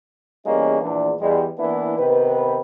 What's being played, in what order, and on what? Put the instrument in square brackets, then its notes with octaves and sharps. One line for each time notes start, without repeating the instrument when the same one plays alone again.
[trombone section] E2 G3 G#3 A#3 C#4 D#4
A#1 E2 D4
E2 G3 G#3
E3 A#3 B3 D4 E4
C3 D#3 B3 B4